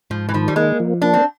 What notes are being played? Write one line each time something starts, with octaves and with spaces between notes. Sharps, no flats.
G#2 F3
E3
D#3 F3
G3
G#3 A#3
F3
A#3 D4
C4